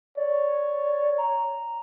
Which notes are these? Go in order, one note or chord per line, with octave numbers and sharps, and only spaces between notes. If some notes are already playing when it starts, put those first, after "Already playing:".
C#5 D5
A#5